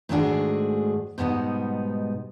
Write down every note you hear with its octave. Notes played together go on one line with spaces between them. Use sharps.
G#2 D#3 A3 D4 F#4 G#4
G#2 B2 G3 B3 D#4